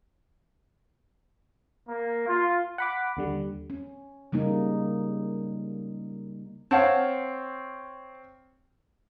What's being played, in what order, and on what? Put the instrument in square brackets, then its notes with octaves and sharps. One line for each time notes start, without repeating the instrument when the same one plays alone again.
[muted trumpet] A#3
F4
[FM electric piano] F#5 B5 D6
D#2 D3 G3
[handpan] C#4
C#3 G3 A#3 D#4
[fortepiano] C4 C#5 F5 [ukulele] C5 F#5 A5